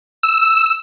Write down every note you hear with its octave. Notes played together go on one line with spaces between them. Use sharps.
E6